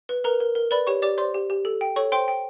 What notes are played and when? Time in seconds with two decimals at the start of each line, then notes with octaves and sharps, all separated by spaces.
0.09 B4
0.24 A#4 B4 A#5
0.40 A#4
0.55 A#4
0.71 B4 D5 B5
0.87 G4 C#5 C#6
1.02 G4 D5 D6
1.18 C5 D5 C6
1.34 G4
1.50 G4
1.65 A4
1.81 G5
1.96 A4 C#5 C#6
2.12 C5 G5 C6
2.28 G5